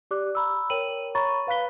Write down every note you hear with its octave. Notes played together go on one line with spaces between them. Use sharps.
G4 D5 D6 F#6
A#5 B5 E6
A#4 C#5 G5 D#7 F#7
C#5 A#5 B5 C#6 A6
B4 F5 B5 F#6 B6 G7